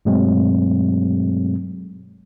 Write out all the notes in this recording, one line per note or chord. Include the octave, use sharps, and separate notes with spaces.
G2 B2 F#3 G#3 A3 C4